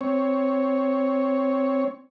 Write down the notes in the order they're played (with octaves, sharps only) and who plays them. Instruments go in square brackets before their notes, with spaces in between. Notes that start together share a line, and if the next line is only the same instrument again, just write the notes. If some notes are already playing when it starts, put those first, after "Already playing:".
[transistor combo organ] C4 C#5